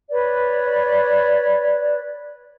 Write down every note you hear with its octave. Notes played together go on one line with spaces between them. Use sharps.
B4 C#5 D5